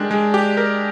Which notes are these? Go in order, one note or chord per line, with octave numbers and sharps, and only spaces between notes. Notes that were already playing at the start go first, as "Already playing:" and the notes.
Already playing: G#3 D4 G4 A#4
G#3
G4
A#4